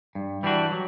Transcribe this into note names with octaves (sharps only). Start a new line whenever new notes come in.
G2
E3 G3 D4 F#4
F#3